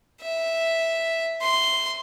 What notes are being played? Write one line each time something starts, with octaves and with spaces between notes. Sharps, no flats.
E5
C6